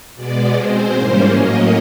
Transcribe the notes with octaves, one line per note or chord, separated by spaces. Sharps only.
B2 G#3 B3 D5
B2 G#3 C4 C5
G#2 E3 G3 A#3 C#4 C5
A2 F#3 A#3 C#4 D#5